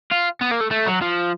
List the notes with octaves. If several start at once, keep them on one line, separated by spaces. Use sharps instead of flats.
F4
B3
A#3
A3
A3
F#3
F3